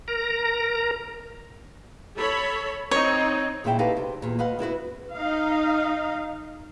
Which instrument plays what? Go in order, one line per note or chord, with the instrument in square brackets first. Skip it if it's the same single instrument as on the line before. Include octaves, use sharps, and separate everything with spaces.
[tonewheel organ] A#4 A#5
[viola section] A4 C#5 B5
[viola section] C4 D#4 [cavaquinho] C#5
[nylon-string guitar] D#2 A#2 G#3 E4 E5 G5
D#4 E4 G4 A4 B4 F5
C3
E2 A#2
B4 D#5 F5 F#5
B3 E4 F#4 B4
[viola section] D#4 F5